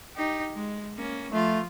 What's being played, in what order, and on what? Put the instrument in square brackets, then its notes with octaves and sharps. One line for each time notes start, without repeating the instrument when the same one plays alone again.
[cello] D#4 G4
G#3
A#3 C#4
[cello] F3 F4 [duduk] A3